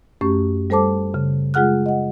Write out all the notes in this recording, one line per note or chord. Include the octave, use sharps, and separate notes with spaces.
F#2 A3 C#4 G4 C#6
G3 A4 C5 A5 D6
C#3
G#3 F4 G#4 F#5 F6 F#6
D#5 F#5